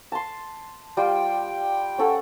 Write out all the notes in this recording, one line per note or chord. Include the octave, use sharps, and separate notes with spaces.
A5 C6
G3 F4 G5 C6
C#4 A4 F#5